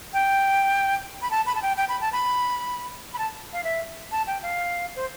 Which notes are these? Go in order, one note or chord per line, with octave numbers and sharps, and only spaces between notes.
G5
B5
A5
B5
A5
G5
G5
B5
A5
B5
B5
A5
F5
E5
A5
G5
F5
C5